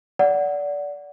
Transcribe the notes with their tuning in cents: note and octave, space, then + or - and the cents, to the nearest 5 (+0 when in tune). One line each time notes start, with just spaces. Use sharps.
D5 -20 F#5 +0